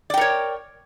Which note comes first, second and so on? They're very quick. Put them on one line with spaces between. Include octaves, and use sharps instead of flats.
D5 G5 A#4 C#5